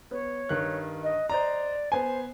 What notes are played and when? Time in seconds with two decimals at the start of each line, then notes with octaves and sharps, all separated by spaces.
0.11 B3 C#5
0.49 G2 D#3 F#6
1.03 D#5
1.29 C5 D5 D#5 A#5
1.92 B3 C5 G#5